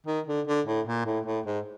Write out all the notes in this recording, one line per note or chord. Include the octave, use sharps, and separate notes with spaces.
D#3
D3
D3
A2
A#2
A2
A2
G#2